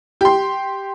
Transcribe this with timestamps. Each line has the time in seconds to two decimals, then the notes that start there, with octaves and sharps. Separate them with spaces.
0.21 G4 C6